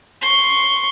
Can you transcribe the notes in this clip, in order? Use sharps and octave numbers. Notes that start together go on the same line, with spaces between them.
C6 C#6